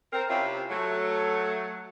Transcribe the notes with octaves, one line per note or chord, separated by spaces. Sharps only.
C4 A#4
C3 C4 C#4 E4 F4 G4
F#3 A3